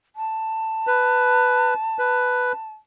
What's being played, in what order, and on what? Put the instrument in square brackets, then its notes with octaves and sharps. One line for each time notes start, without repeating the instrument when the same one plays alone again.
[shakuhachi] A5
[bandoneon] B4
B4